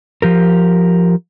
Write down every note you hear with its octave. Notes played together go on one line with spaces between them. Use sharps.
F3 G4 A#4